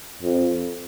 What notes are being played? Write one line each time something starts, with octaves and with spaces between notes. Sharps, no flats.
F2